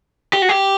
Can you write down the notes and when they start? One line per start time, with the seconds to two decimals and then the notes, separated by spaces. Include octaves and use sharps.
0.33 G4
0.42 F#4
0.49 G4